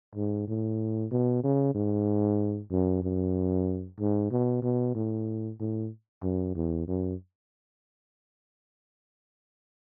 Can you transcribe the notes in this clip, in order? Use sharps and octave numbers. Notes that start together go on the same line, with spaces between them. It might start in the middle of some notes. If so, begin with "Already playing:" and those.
G#2
A2
B2
C#3
G#2
F#2
F#2
G#2
B2
B2
A2
A2
F#2
E2
F#2